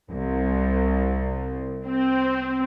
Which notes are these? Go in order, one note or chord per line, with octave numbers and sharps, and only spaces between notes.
C2
C4